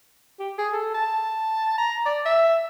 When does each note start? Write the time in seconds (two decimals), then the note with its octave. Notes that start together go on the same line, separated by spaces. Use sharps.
0.39 G4
0.59 G#4
0.72 A4
0.94 A5
1.78 A#5
2.06 D5
2.26 E5